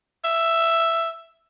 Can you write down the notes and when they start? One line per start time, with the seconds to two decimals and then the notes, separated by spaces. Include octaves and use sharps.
0.25 E5